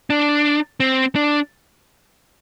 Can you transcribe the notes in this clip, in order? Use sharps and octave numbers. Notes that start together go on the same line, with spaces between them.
D4
C4
D4